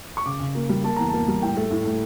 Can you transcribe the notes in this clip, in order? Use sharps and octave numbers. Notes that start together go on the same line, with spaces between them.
C#6
C#3 D6
C#3
A#3
G3
A#3 A5
E2 A#5
A5
A#3
G3
A2 G5
A3
A2
A2